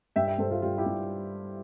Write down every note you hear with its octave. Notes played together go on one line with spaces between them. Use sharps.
G2 E5 G5
E5 G5
G2 A4 C5
F4 A4
G3 F4
E4 G4
G2